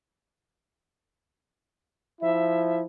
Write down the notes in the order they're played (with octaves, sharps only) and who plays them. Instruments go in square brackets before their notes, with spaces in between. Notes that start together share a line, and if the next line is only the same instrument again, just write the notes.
[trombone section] F3 E4 [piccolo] E5